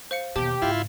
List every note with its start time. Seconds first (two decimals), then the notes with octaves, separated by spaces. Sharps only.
0.11 C5 F5 C#7
0.36 D#2 B2 G4 A5 D6
0.62 G#2 C#3 E4 F4